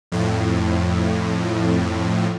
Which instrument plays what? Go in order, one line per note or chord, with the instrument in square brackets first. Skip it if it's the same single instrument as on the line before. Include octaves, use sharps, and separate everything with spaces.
[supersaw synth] F2 A2